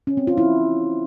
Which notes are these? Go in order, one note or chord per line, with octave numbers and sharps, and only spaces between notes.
C#4
C4
F4
E4